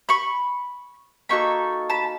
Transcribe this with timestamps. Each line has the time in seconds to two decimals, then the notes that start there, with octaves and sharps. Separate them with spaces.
0.09 B5 C#6
1.29 A#3 D#4 F#4 A4 B5 C#6
1.90 A5 B5